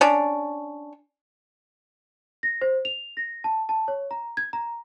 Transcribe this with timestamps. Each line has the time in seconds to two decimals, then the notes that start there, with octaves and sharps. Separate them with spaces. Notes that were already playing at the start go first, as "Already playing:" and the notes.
0.01 C#4 D4
2.43 A#6
2.62 C5
2.85 F7
3.17 A#6
3.44 A5
3.69 A5
3.88 C#5
4.11 A#5
4.37 G#6
4.53 A#5